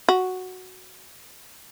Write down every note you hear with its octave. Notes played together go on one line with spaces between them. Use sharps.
F#4